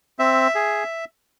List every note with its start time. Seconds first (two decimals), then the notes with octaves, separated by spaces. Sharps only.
0.19 C4 E5
0.55 G#4